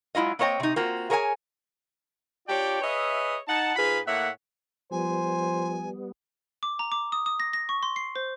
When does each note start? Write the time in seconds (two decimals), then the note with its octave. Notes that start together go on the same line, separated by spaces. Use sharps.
0.15 F#3 G#3 E4 F4 D#5
0.39 A#3 C4 C#5 D#5 G5
0.60 C3 D#4
0.76 A#3 C4 F4 F#4
1.10 G#4 A#4 C#5 F5 G#5
2.48 D4 F4 G4 C#5 D5 G5
2.81 G#4 B4 C#5 D#5 E5
3.48 D#4 F#5 A5
3.76 G#2 F4 G#4 B4 F5 B5
4.07 A2 A#3 C#5 E5 F#5
4.92 F3 G3 B3 C5 G#5
6.63 D6
6.79 A#5
6.92 D6
7.12 D#6
7.26 D#6
7.40 A#6
7.53 A#6
7.69 C#6
7.83 C6
7.96 C7
8.16 C5